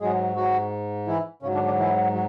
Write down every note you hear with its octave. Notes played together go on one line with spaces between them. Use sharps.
G#2 F#3 G#3 G#4
F#3 F#4
E3 E4
G#2 C#3 F#3 C#4
D3 D4
D3 D4
E3 E4
F#3